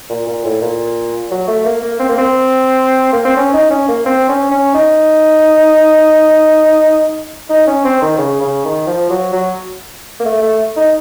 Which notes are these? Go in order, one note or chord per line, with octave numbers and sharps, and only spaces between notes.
A#2
A#2
A2
A#2
F#3
A3
A#3
A#3
C4
A#3
C4
A#3
C4
C#4
D#4
C#4
A#3
C4
C#4
C#4
D#4
D#4
C#4
C4
D#3
C#3
C#3
D#3
F3
F#3
F#3
A#3
A3
A3
D#4